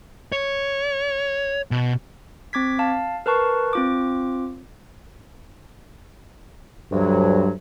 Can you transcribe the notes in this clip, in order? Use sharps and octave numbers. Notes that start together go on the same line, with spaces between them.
C#5
B2
C4 D6 G#6 B6
F5 A5
A#4 B4 A5 C#6
C4 F4 D6
D2 G2 F#3